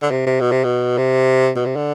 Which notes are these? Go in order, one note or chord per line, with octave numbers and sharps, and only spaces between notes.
D3
C3
C3
B2
C3
B2
C3
B2
C3
D3